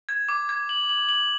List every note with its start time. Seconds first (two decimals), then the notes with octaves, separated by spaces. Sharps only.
0.09 G#6
0.29 D6
0.49 G#6
0.69 F#7
0.89 F#7
1.09 F#7